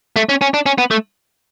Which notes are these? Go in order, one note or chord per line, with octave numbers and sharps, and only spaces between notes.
A3
C#4
C#4
D4
C#4
B3
A3